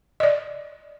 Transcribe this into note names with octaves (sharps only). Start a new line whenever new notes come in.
D5 D#5